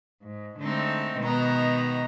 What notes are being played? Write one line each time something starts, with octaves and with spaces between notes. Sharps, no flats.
G#2
D3 G#3 A3 C4 D#4
B2 D#3 G#3 B3 D#4 A#5